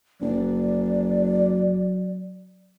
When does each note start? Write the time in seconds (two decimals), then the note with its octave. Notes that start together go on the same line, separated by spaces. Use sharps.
0.21 F#1 F#3 D5